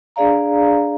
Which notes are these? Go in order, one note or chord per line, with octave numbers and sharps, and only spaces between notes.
D4 G#4 D5 F5 A#5